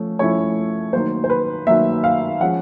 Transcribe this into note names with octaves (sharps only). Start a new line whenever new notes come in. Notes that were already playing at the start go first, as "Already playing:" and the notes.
Already playing: F3 A3 C#4
F3 A3 C#4 E4 C#5
D#3 F#3 A#3 C5
C5
B4
D#3 F#3 A#3 E5
F5
F3 G#3 C#4 F#5